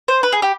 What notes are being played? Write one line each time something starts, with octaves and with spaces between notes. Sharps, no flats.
C5
B4
G#4
G4